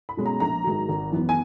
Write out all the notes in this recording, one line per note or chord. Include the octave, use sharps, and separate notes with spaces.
B5
B2 G#3 C#4
A#5
A#1 A#5
G#2 D#3 F#3
G#1
F#2 E3 B3
G#5